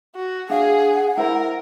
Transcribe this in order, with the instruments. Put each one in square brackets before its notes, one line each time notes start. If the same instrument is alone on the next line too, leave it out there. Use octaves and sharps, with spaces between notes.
[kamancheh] F#4
[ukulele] D4 F5 [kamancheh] G#4 [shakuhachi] F#5
[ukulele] E4 C5 B5 [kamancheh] A#4